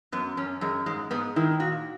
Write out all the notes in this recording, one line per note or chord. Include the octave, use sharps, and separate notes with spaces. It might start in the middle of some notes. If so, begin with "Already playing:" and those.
F#2 B3
F#2 C#4
F#2 G#3
G#2 G#3
G#2 B3
D#3 E4
A#2 F#4